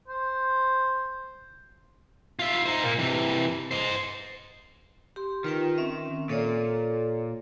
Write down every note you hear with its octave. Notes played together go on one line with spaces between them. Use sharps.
C5
F4 E5
D#4 C5
A#2 A#3
C3 E3
C5 D#5
G4 C6
D#3 F4 B4 G5
C4 C#4 E5
A#2 A4 C#5 D5